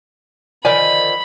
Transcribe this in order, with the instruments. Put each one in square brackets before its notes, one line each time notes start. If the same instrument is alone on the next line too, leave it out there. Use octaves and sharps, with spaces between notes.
[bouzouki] D3 D#3 F3 [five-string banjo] A#4 D5 G#5 [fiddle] B5